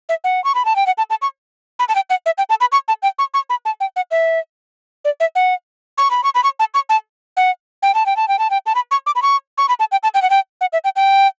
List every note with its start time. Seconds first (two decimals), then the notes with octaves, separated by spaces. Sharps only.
0.09 E5
0.24 F#5
0.44 C#6
0.55 B5
0.65 A5
0.76 G5
0.86 F#5
0.98 A5
1.10 A5
1.22 C#6
1.79 B5
1.89 A5
1.95 G5
2.10 F#5
2.26 E5
2.38 G5
2.50 A5
2.61 B5
2.72 C#6
2.88 A5
3.03 G5
3.19 C#6
3.34 C#6
3.50 B5
3.65 A5
3.80 G5
3.96 F#5
4.11 E5
5.05 D5
5.20 E5
5.35 F#5
5.98 C#6
6.11 B5
6.24 C#6
6.35 B5
6.44 C#6
6.59 A5
6.74 C#6
6.89 A5
7.37 F#5
7.83 G5
7.95 A5
8.06 G5
8.16 A5
8.28 G5
8.39 A5
8.50 G5
8.66 A5
8.75 B5
8.91 C#6
9.06 D6
9.16 B5
9.22 C#6
9.58 C#6
9.69 B5
9.80 A5
9.92 G5
10.03 A5
10.14 G5
10.22 F#5
10.30 G5
10.61 F#5
10.73 E5
10.84 G5
10.96 G5